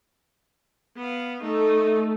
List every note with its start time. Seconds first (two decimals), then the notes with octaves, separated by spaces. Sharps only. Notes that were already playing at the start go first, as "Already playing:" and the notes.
0.97 B3 F5
1.43 A3 D#4 A4